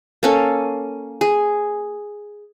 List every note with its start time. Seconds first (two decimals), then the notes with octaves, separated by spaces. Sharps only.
0.23 A#3 C#4 A4
1.21 G#4